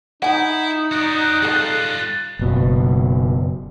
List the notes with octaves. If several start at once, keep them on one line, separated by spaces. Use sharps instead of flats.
D#4 E4 F#5 G#5
F#4 D5 F#6
G3 F4 G#4 A4
F#1 B2